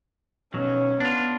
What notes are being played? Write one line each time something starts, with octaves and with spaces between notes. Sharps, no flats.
B1 F#3 C#4
B3 D4 F4